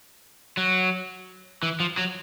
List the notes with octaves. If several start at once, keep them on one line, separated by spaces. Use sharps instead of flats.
F#3
E3
F3
F#3